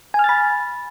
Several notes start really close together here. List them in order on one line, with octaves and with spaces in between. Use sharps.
G#5 F6 A6 B5